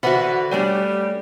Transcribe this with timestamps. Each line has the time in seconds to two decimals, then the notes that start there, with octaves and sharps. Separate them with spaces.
0.03 D3 E3 F#4 B4 C5 E5 F#5
0.51 G3 A3 C#4 D4 D5 G5